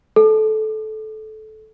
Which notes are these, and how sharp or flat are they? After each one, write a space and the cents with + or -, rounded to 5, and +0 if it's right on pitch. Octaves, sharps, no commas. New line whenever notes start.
A4 -20